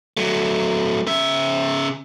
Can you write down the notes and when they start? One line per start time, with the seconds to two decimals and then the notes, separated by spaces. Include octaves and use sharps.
0.17 F#3 A3
1.07 C#3 E5